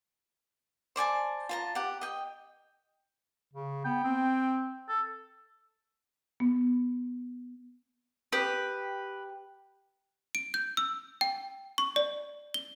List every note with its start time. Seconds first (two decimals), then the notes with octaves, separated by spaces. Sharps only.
0.96 C5 D5 G#5 A5
1.49 F4 A5 A#5
1.75 G4 F#5
2.01 D#5 G5
3.53 C#3
3.85 B3 G5
4.04 C4
4.89 A4
6.40 B3
8.32 G4 B4 D#6
10.35 D7
10.54 G6
10.77 E6
11.21 G5
11.78 C#6
11.96 D5
12.54 G7